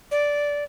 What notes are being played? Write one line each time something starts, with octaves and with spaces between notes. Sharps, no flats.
D5